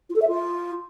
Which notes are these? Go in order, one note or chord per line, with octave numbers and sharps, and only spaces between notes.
F4
A4
E5
F4